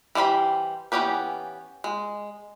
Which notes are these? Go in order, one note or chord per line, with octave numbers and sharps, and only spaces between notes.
E3 G3 G4 C5 B5
E3 B3 C#4 G4 B4
G#3